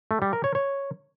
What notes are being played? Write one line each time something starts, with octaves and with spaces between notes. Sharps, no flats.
A3
G3
A#4
C#5
C#5